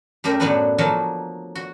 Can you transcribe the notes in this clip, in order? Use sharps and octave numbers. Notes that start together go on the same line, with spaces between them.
F#2 A3 G4 A#4 E5
A2 F#3 B3 D4 F#4 B4
F3 F#3 A3 A#3 F#4
F#4